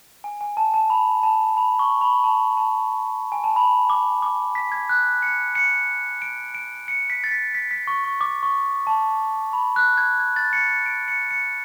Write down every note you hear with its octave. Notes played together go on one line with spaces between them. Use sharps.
G#5
G#5
A5
A5
B5
A5
B5
C#6
B5
A5
A5
G#5
A5
B5
D6
D6
B6
G#6
F#6
C#7
C#7
D7
D7
C#7
B6
A6
B6
B6
B6
C#6
C#6
D6
C#6
A5
B5
F#6
G#6
G#6
A6
C#7
C#7
D7
C#7
C#7